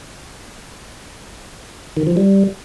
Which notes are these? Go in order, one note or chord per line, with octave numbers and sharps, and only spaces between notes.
D#3
F3
G3